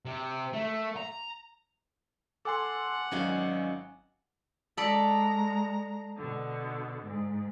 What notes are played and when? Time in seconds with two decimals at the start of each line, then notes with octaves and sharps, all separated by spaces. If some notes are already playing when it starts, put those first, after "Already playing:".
0.05 C3
0.53 A3
0.97 A#5
2.45 A4 F#5 G#5 C6 D6
3.11 G#1 F#3 C#4 D#5 F5
4.77 G#3 A4 D5 A#5 B5
6.17 B2 D3
7.05 G#2